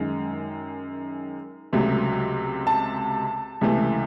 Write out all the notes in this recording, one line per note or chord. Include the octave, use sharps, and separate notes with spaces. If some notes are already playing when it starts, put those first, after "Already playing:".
Already playing: F#2 D#3 G#3
C#2 C3 F#3 A3
A5
C#2 C3 E3 A3